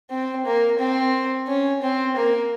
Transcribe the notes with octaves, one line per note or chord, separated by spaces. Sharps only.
C4
A#3
C4
C#4
C4
A#3